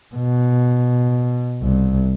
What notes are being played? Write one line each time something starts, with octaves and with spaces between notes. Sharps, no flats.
B2
C2